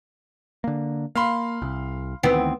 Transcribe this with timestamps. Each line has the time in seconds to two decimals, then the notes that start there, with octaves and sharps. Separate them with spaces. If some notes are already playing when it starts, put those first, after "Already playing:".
0.64 D3 A#3
1.15 A#3 F5 B5 C6
1.62 C2
2.23 D2 D#3 E3 B3 C4